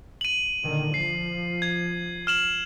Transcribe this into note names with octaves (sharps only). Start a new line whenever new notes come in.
D#7 F#7
A#2 D3 D#3
F3 C7
G#6
F6 E7 F#7